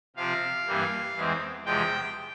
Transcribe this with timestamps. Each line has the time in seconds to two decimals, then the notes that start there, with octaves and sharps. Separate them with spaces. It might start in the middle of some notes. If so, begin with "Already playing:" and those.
0.16 C3 F3 C4 F5
0.67 G2 E3 G3 A#3
1.16 E2 E3 G#3 C4
1.64 E2 C3 F3 G#3 G5